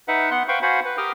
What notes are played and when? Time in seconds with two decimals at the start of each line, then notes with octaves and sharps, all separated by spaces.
0.08 D#4 B4 E5 F#5
0.31 B3 F#5 C6 F#6
0.48 B4 C5 F5 G5 B5 C#6
0.62 F#4 C5 F5 F#5 G#5 B5
0.85 B4
0.98 G4 A#4 G5 D6 D#6 F6